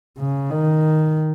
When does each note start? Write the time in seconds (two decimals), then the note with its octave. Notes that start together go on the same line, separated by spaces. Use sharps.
0.19 C#3
0.51 D#3